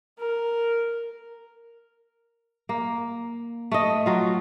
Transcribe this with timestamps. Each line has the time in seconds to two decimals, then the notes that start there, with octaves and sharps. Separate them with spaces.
0.19 A#4
2.69 A#3
3.72 A3 D#5
4.06 F#3 F4